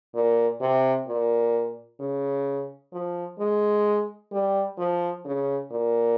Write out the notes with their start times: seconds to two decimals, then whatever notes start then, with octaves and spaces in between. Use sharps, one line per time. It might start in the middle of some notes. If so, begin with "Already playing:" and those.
0.15 A#2
0.61 C3
1.08 A#2
2.00 C#3
2.93 F3
3.39 G#3
4.32 G3
4.78 F3
5.25 C#3
5.71 A#2